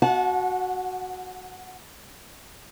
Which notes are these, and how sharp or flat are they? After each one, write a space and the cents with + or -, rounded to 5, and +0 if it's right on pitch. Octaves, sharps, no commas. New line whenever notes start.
F#4 +0 F#5 -30 A5 -35